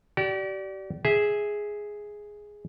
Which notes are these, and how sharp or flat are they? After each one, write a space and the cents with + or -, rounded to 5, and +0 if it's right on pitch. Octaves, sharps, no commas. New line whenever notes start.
G4 -40 D5 -5
G#4 +0 E5 -15